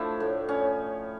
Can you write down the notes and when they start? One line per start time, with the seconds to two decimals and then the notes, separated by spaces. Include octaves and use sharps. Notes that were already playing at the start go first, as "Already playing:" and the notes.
Already playing: F3 A3 D4 E4
0.20 A2
0.49 C#4